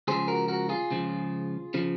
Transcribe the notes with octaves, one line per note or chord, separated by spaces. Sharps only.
C#2 C#3 F3 G#4 C5
F#4 A#4
F#4 A#4
F4 G#4
C#2 C#3 F3
C#3 F3